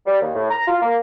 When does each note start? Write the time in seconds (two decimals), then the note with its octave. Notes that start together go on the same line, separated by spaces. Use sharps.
0.06 G3
0.21 D#2
0.34 A2
0.51 A#5
0.68 F4
0.82 A#3